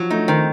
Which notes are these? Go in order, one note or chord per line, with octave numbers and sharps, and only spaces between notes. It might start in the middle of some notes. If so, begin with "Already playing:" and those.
Already playing: F3 F#3
A3 D#4
D#3 C4